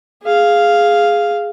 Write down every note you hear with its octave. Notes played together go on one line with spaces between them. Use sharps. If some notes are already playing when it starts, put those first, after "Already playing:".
G#4 F5